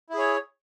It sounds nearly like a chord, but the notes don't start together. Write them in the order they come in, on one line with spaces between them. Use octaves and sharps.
E4 G#4 C#5